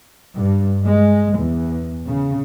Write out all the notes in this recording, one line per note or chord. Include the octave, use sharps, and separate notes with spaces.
G2
G#3
E2
C#3